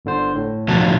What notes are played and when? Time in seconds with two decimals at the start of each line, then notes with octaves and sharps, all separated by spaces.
0.05 G1 D3 C5
0.35 A2
0.68 B2 D3 F3